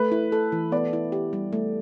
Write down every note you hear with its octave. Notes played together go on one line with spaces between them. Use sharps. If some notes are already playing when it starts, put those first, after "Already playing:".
Already playing: A3 B4
E4
A4
E3
B3 D5
E4
G4
G3
A3